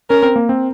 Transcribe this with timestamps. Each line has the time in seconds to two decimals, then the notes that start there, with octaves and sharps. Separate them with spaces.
0.10 C#4 A#4
0.23 C4
0.36 A#3
0.49 C4